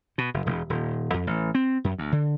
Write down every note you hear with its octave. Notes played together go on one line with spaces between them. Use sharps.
B2
F#1
E1
D#1
F2
A1
C4
F#2
D2
D3